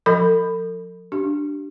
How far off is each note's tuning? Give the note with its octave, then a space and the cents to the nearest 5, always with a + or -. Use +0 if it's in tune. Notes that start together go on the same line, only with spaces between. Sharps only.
F3 +35 A4 +45 B5 +10
D4 +0 G4 -20